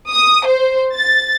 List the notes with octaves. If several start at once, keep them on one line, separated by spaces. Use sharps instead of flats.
D#6
C5
A6